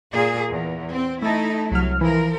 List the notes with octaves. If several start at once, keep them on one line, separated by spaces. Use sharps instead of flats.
A#2 G#4
E2
C4
A3 D#4 E4 A5
C2 F#3 F6
E3 F3 A#4